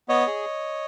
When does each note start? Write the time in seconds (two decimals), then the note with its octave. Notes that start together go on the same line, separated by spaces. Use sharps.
0.08 B3 C#5 D#5
0.27 G#4